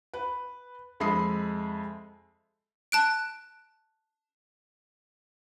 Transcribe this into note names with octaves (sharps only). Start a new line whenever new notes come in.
B4
F2 G#3 E5 B5 D#6 C7
A5 F#6 D7